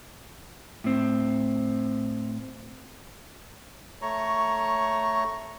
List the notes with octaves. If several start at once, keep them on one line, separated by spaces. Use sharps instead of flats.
A2 C4
A3 C#5 A#5 C#6